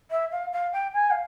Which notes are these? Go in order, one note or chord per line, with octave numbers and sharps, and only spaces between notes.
E5
F5
F5
G5
G#5
F5